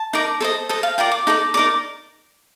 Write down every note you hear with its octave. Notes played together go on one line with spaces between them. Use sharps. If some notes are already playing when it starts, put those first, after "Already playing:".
Already playing: A5
D#4 A#4 D5
A4 C5 D#5
A4 C5 D#5
F5
F4 A#4 D5 G5
D6
D#4 A4 D5
D#4 A#4 D5 D6